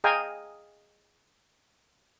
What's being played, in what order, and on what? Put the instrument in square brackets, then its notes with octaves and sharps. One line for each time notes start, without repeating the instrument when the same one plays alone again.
[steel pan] G#4 D#5 F5 G5 G#5 A#5